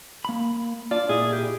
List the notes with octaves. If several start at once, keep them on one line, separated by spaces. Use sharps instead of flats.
A#3 B5
F4 D5
A#2 E4 G#4 D#5
G4